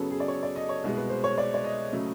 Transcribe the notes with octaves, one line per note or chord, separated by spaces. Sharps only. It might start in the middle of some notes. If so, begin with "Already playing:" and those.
Already playing: F#2 C#3 F#3 B3 G#4 A4
G#4
D5
C#5
D5
D#5
C#5
C2 B2 G#3
B4
C5
C#5
D5
D5
D#5
C#3 F#3 A3